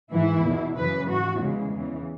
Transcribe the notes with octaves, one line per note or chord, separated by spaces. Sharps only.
G#2 E3 E4
E2 B2
F#2 C#3 E3 B4
G#2 E3 F#4
E2 C#3 E3 G#3
E2 C#3 E3